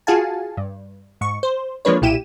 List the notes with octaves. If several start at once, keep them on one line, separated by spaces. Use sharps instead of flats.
F4 F#4 G#4 F5 G#5 A5
G2
G#2 C#6
C5
F3 G#3 A#3 D4 B4 C#5
B1 A#2 E4 G4 D#7 E7